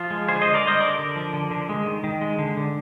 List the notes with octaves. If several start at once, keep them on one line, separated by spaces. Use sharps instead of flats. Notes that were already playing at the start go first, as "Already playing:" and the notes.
Already playing: F3 F4
G#3
D3 G#4 C5
D3 C5 D#5
A#4 D5
G3 C5 D#5
D3 A#4 D5
D3
F3
D3
D3
G#3
D#3
D#3
G#3
D3
D3